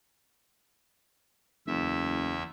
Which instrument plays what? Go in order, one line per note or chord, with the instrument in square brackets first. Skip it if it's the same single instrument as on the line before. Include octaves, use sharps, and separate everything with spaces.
[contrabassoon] F#1 [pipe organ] E2 E5